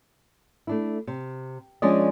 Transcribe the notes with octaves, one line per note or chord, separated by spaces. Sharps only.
A3 D4 E4
C3
F3 G#3 C#4 D4 D5 D#5